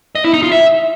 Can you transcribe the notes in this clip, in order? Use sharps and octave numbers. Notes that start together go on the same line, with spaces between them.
D#5
E4
D#4
F4
E5